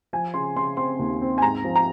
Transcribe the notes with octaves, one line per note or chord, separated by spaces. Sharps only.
F3 G#5
C#3 C6
C#3 C6
C4 C6
D#2
C4
G#5
G#2 A#5
F3
A#5